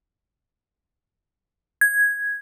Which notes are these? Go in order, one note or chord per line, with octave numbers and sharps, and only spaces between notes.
G#6